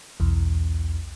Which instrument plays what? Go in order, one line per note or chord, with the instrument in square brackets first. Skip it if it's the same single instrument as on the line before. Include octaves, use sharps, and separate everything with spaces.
[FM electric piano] B1 E2